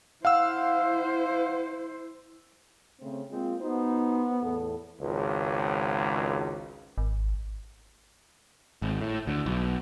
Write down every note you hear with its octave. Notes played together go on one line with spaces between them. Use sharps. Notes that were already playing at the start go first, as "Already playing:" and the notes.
E4 C5 F5 F#5 E6
C#3 A3 C4
G#3 A#3 C4 F4
B3 D#4 F#4 C5
E2 A2 A4
G#1 C#2
G#1
G#1
A2
D2
B1